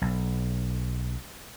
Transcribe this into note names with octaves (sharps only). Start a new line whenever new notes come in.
B1